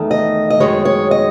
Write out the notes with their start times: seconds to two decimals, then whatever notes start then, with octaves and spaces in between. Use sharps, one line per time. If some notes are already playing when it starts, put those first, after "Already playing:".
Already playing: E2 D#3 A3
0.11 D#5
0.50 D#5
0.60 F#2 D#3 G#3 C#5
0.85 C#5
1.11 D#5